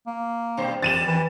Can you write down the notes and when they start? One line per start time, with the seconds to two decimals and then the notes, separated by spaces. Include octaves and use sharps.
0.07 A#3
0.57 G2 B2 C5
0.82 E2 G4 A6 D#7 E7
1.07 E3